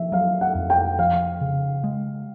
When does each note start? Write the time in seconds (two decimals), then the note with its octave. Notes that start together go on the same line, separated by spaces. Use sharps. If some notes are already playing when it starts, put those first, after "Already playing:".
Already playing: F3 E5
0.12 F#3 F5
0.41 F#5
0.55 F2
0.70 G5
0.99 F3 F5
1.41 C#3
1.84 G#3